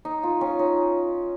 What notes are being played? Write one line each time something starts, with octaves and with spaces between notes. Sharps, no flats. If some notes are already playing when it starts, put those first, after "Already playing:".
D#4
F4
C#4
D#4